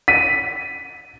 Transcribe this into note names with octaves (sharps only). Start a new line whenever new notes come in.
B6 D#7